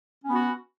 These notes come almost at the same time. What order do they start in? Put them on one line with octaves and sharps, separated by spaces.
C#4 B3 F#4